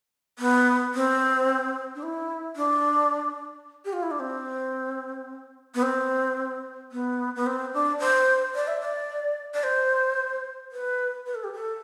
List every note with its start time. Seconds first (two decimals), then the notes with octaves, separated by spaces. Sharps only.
0.39 B3
0.94 C4
1.95 D4
2.03 E4
2.56 D4
3.85 G4
3.93 F4
4.03 E4
4.11 D4
4.20 C4
5.75 B3
5.83 C4
6.92 B3
7.36 B3
7.46 C4
7.74 D4
8.00 C5
8.55 D5
8.68 E5
8.80 D5
9.54 D5
9.64 C5
10.72 B4
11.26 B4
11.35 A4
11.44 G4
11.53 A4